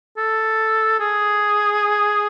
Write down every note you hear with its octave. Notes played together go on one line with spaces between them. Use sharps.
A4
G#4